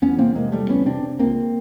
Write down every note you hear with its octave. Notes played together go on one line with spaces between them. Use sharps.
E2 B3 C#4
C3 A#3 C4
C3 G#3 A#3
E2 G3 A3
C#2 B3 C#4
C3 C4 D4
C3
C#2 A#3 C4